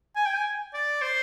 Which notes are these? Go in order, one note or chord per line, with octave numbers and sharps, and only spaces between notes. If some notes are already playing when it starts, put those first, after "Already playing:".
G#5
G5
G#5
D5
C5